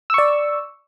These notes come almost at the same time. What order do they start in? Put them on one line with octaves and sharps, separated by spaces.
E6 C#6 D5